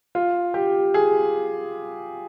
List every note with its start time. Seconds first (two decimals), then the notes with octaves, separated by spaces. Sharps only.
0.15 F4
0.54 G4
0.94 G#4